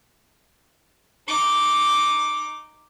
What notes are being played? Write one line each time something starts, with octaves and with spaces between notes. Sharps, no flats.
D#4 D6